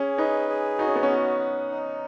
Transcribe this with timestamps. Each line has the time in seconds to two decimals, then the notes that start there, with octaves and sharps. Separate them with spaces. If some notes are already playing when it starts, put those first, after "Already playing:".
Already playing: C#4 G#4
0.18 D#4 B4
0.49 G#4
0.79 D#4 F#4
0.87 C#4
0.96 B3
1.03 C#4
1.10 F#4
1.40 F#5
1.70 D#4